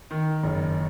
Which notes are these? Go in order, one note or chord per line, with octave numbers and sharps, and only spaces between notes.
D#3
F#1